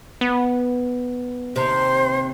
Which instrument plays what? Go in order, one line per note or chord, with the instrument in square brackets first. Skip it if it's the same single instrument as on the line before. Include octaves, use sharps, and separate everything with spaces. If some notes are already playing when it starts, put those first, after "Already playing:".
[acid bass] B3
[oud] D#2 C3 [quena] C5